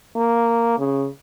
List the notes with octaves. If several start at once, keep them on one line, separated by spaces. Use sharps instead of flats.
A#3
C#3